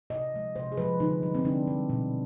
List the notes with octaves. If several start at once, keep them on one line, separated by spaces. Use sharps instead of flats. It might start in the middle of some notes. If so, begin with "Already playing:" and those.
C3 D#5
F3 G#3
C3 C5
G#4
F3 G#3 B4
D3 D#4
G3
C4
D3 D4
G3
B2